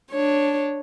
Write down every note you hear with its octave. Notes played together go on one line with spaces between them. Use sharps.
D4 C#5